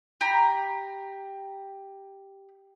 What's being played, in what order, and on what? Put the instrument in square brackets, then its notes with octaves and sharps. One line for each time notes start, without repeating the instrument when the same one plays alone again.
[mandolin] G4 A#5 B5